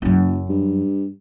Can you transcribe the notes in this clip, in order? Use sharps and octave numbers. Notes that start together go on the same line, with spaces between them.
F#1 F#2 F#3
G2